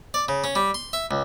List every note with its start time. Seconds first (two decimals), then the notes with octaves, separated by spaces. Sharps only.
0.14 D5
0.28 C#3
0.44 C#4
0.55 G3
0.74 C6
0.93 E5
1.11 C#2